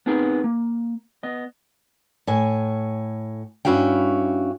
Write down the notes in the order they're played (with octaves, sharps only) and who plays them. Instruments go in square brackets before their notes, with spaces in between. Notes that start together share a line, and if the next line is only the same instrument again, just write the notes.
[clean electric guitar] B3 C4 D#4 G#4 A#4 B4
A#3
B3 D#5
[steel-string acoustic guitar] A2 C#5 G#5
G2 C#4 E4 F#4 F5 G5